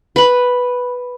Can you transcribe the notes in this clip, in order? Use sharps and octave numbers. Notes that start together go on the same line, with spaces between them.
B4 B5